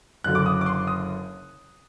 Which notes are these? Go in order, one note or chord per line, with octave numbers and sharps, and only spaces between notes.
F#1 F#2 D3 F#3 F#6
D6
D#6
D6
C6
D#6